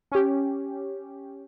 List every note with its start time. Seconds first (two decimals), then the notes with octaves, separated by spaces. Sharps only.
0.12 C#4 G4